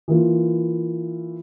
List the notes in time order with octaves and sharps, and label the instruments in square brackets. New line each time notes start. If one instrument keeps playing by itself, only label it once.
[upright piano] E3 A#3 F4